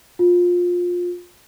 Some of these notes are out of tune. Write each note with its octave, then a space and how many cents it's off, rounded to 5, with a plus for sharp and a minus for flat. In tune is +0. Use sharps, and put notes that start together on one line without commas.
F4 +20